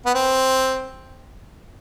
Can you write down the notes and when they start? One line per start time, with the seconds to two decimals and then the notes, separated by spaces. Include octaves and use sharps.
0.06 B3
0.14 C4